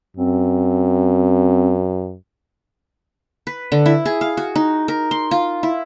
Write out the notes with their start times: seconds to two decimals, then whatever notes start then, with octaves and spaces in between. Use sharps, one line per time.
0.17 F#2 C4
3.47 B4
3.72 D3
3.86 E4
4.05 G#4
4.21 F5
4.37 F#4
4.56 D#4
4.88 A#4
5.11 C6
5.31 F4
5.63 E4